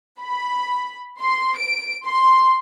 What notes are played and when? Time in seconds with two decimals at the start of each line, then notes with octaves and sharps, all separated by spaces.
0.21 B5
1.20 C6
1.57 D7
2.05 C6